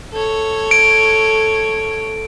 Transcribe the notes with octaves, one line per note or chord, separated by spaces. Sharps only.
A4 C#5
D7